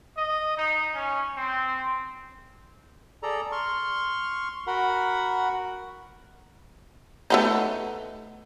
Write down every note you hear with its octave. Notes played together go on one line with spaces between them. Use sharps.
D#5
D#4
C#4
C4
G#4 A4 D5 A#5
C6 C#6 F6
F#4 A#4 F#5 B5
A3 B3 D#4